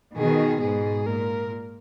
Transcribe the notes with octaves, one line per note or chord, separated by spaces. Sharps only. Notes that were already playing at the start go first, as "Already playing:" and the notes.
B2 D#3 G#4
G#2 B2 G#4
A#2 A#4